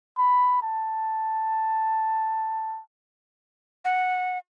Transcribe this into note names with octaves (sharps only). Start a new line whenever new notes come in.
B5
A5
F#5